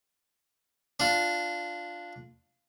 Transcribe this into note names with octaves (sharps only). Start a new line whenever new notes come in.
D4 F4